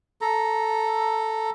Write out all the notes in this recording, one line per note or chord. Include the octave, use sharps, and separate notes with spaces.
A4 A#5